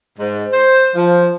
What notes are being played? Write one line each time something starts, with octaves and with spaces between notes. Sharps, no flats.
G#2
C5
F3